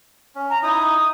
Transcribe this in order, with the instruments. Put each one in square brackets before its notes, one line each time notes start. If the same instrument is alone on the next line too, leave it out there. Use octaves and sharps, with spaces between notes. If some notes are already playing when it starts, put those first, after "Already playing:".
[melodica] C#4
[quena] A#5
[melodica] D#4 E4 [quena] D#6